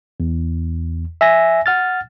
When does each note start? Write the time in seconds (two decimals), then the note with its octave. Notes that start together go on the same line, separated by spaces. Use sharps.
0.20 E2
1.21 E5 G#5 A#6
1.66 F#5 F6 A6